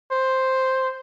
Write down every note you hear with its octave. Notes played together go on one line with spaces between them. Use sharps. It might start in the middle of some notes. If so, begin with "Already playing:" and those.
C5